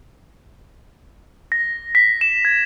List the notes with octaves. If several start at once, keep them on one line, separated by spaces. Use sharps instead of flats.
A#6
B6
E7
G#6